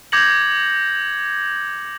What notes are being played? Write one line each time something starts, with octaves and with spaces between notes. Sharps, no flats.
D6 G6 G#6 A#6 C#7 F#7